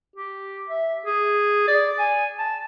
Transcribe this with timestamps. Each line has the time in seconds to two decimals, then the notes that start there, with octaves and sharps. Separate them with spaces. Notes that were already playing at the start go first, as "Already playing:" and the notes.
0.16 G4
0.69 E5
1.06 G#4
1.68 D5
1.99 G#5
2.39 A5